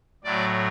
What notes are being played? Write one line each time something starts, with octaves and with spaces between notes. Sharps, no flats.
A2 F#3 D5